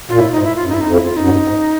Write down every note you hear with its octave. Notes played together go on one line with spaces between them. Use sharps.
A#2 F4
A2 E4
D#4
G#2
E4
F4
F#2
D#4
G2 E4
F2 D#4
E4
F4
F#2 D#4
G2
G#2